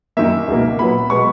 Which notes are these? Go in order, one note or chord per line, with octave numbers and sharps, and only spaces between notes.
F#2 D#3 A#3 E5
C#2 B2 A#3
A#2 F#3 B3 B5
B2 G#3 B3 C#6